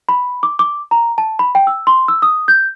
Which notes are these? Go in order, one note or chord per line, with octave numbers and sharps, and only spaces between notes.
B5
D6
D6
A#5
A5
B5
G5
E6
C6
E6
D#6
G6